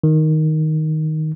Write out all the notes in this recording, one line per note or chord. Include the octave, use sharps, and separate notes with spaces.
D#3